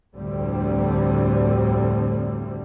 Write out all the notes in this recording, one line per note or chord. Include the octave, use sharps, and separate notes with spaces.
F1 D2 A2 D3 G3 C4